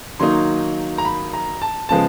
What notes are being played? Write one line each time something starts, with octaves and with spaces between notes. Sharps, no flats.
D#3 F#3 A#3 D#4 C6
A#5
B5
A#5
A5
C#3 F3 G#3 B3 A5